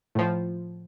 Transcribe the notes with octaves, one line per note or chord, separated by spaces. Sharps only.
A2 F3